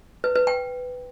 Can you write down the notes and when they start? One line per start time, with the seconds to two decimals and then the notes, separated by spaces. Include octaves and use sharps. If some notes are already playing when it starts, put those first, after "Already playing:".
0.24 B4
0.35 B4
0.47 G5